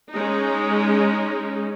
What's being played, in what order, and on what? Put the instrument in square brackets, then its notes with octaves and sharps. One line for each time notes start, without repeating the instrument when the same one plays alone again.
[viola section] G#3 C#4 D#4